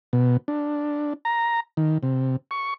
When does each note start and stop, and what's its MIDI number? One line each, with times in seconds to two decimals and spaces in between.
0.13 0.37 47
0.48 1.13 62
1.25 1.60 82
1.77 1.98 51
2.03 2.36 48
2.51 2.74 85